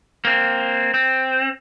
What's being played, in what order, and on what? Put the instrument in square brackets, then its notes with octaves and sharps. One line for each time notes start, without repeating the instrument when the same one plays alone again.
[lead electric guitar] A#3 C4
C4